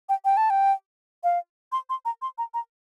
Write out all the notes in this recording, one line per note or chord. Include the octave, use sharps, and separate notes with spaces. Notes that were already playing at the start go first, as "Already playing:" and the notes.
G5
G5
A5
G5
F5
C6
C6
A#5
C6
A#5
A#5